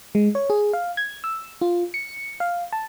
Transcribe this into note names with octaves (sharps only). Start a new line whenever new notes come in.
G#3
C#5
G#4
F5
G#6
E6
F4
C#7
F5
A5